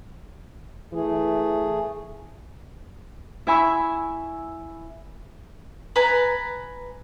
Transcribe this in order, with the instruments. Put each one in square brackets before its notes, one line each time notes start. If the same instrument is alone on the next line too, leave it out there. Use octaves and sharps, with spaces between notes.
[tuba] E3 [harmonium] A3 G#4
[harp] E4 E5 G#5 B5 C#6 E6
[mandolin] B4 G#5 A#5